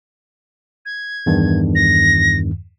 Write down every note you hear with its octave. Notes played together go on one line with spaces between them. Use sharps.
G#6
E2 G2 D#3
A#6